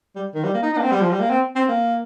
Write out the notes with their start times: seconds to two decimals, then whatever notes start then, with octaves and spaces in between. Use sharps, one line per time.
0.16 G3
0.35 D#3
0.44 G3
0.54 A#3
0.63 D#4
0.73 D#4
0.78 A#3
0.83 C4
0.91 G3
1.01 F3
1.11 G3
1.20 A#3
1.30 C4
1.56 C4
1.68 A#3